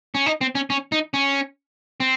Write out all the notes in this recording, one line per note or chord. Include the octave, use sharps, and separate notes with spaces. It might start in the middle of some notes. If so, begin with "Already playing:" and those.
C#4
D#4
C4
C#4
C#4
D#4
C#4
C4